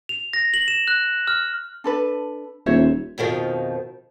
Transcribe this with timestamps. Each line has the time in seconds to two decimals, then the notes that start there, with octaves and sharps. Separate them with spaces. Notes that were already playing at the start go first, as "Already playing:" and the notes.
0.09 F7
0.33 A#6
0.54 F#7
0.68 E7
0.88 F#6
1.28 F6
1.84 D4 A4 B4
2.66 D#1 C5 C#5 E5
3.18 F2 B2 D#3 F3